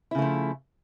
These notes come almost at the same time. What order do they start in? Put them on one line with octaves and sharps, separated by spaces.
E4 C#3 A3 F3